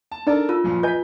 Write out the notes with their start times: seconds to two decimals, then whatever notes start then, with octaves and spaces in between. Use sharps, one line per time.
0.12 A5
0.27 D4 D#4 A4 A#4 D5 A5
0.49 F4 E6
0.64 F#2 A#2 F3
0.83 B4 D#5 G#5 G6 B6